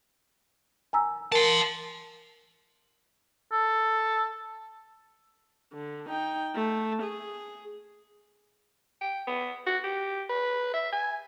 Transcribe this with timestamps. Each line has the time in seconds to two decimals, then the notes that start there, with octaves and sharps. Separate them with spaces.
0.93 G#5 A#5 E6
1.32 A#4 A5 C6
3.52 A4
5.73 D3
6.10 D#4 G5
6.55 A3
7.03 G#4
9.01 G5
9.27 B3
9.66 F#4
9.84 G4
10.30 B4
10.74 E5
10.93 G#5